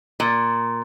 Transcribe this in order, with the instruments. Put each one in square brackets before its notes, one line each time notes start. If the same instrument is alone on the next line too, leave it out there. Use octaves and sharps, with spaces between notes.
[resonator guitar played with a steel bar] A#2